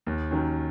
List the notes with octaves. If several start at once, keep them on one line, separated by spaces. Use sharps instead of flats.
D#2
D#3 F#3 C#4